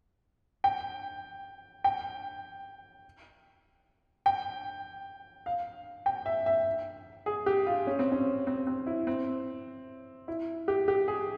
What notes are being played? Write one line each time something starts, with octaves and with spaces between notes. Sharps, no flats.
G5
G5
G5
F5
G5
E5
E5
G#4
G4
F4
C#4
C4
C#4
C4
C4
E4
C4
E4
G4
G4
G#4